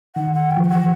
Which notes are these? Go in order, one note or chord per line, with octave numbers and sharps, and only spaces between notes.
D#3 F#5
F#5
G5
F3
G5
E3 F#5